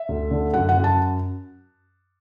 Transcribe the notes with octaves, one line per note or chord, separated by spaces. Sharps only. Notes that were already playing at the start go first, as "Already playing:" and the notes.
Already playing: E5
D2
D3
F#2 F#5
F#5
F#2
A5